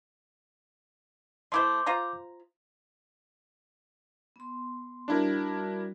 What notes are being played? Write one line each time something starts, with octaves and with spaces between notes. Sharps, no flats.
A3 E4 C5 C6 D6 G6
F4 C5 A#5
B3 C6
G3 D4 E4 F#4 A#4